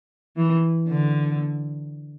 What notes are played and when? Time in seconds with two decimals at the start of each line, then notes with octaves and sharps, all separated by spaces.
0.37 E3
0.88 D3